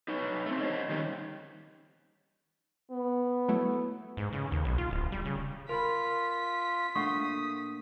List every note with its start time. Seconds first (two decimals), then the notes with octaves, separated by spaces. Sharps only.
0.08 D#4 B4 C#5
0.46 A3 C4
0.61 G4 C5 C#5 D#5
0.89 D#3 G3 A3 C4 C#4 D#4
2.91 B3
3.48 F#3 A3 E4
4.17 G#2
4.33 C#3
4.52 D#2
4.65 B1
4.78 F4
4.91 D1
5.12 G3
5.25 C#3
5.69 F4 A#4 B5 B6
6.95 A#2 A3 D4 F#5 C#6 D#6